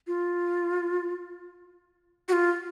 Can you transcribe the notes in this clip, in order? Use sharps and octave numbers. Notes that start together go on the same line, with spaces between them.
F4
F#4
F4